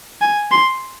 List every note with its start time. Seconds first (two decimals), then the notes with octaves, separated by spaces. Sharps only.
0.21 G#5
0.52 C6